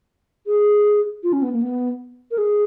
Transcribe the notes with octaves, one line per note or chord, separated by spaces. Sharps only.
G#4
F4
C#4
B3
A#3
B3
A#4
G#4